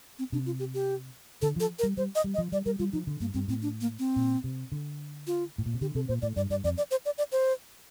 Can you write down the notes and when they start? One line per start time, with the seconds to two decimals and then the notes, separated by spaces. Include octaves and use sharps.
0.19 C4
0.32 C3 D4
0.46 F4
0.59 G4
0.74 G4
1.42 D3 A4
1.56 F3 A4
1.79 A#4
1.83 G3
1.97 G3 C5
2.16 D#5
2.24 G3
2.34 D#5
2.38 F3
2.52 G3 D5
2.66 G3 A#4
2.79 G3 F4
2.93 F3 D#4
3.07 D3
3.20 G2 A#3
3.34 G2 C4
3.48 A2 C4
3.62 D4
3.81 A#3
3.99 C4
4.16 A#2
4.44 C3
4.72 D3
5.27 F4
5.58 A2
5.66 A#2
5.74 C3
5.81 D3 G4
5.95 C3 A4
6.08 A#2 C5
6.22 A2 D5
6.36 G2 D5
6.50 G2 D5
6.64 F2 D5
6.78 D5
6.91 C5
7.05 D5
7.18 D5
7.32 C5